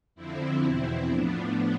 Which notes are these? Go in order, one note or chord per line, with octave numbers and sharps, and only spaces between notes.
F2 D3 F3 C4 E4
E2 B2
A2 F3 B3 D4